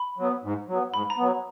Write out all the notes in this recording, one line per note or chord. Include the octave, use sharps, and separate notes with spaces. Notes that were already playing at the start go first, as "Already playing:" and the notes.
Already playing: B5
F#3 B3
G#2
F#3 B3
G#2 B5
A#5
F#3 B3